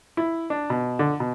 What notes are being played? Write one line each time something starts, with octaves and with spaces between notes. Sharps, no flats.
E4
D4
B2
D3
B2